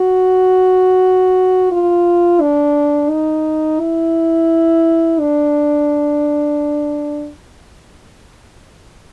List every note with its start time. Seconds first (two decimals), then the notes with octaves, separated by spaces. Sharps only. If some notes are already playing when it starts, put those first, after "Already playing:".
Already playing: F#4
1.71 F4
2.41 D4
3.10 D#4
3.80 E4
5.20 D4